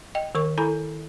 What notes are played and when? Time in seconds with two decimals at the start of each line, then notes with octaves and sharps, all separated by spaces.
0.15 D#5 G5
0.35 D#3 A#4 C#6
0.58 E4 A4 G#5 A#5 B5